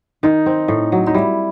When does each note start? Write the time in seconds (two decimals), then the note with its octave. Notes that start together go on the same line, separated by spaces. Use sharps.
0.23 D#3 D#4
0.46 C4
0.68 A2
0.92 F#3
1.07 D#4
1.14 G3 E4